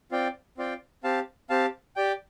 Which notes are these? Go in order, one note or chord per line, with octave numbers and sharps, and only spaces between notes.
C4 F4 D5 G5
C4 F4 D5 G5
C4 G4 F5 A5
C4 G4 F5 A5
G4 D5 G5